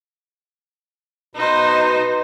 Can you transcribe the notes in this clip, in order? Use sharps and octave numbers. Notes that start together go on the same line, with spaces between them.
B2 D#4 B4 C5